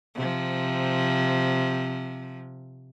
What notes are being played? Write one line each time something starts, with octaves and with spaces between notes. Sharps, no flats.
C3 F3